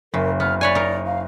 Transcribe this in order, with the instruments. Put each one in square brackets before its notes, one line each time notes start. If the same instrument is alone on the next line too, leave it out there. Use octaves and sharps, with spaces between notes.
[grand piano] F#1 [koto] C#3 [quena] A#4
[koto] B3 [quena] F6
[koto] B4 C#5 G#5 [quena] D5
[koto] D#4 A#4
[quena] F5